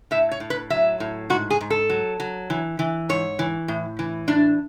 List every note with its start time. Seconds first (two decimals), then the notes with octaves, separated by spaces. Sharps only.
0.11 A2 E5
0.31 C#5
0.40 A2
0.50 B4
0.70 F#3 E5
1.00 A2
1.30 G#2 F#4
1.50 G#4
1.61 G#2
1.70 A4
1.90 F#3
2.20 F#3
2.50 E3
2.79 E3
3.09 G#2 C#5
3.39 E3
3.68 A2
3.99 E3
4.28 A2 D4